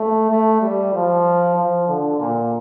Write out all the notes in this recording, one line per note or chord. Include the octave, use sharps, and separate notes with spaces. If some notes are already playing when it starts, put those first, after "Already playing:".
Already playing: A3
A3
G3
F3
F3
D3
A#2